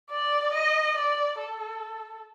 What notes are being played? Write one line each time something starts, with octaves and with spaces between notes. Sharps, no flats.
D5
D#5
D5
A4